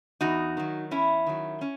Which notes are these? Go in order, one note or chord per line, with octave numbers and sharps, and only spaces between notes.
E2 D#4 F#4
D#3 F#3
E2 C#4 E4
D#3 F#3
C#4